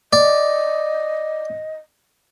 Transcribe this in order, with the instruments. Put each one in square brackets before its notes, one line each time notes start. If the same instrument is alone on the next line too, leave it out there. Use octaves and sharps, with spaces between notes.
[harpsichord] D5 [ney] D#5